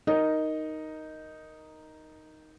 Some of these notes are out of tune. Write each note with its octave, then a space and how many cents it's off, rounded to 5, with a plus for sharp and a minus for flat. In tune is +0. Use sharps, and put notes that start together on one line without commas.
D#4 +0 A#4 +0 D#5 +0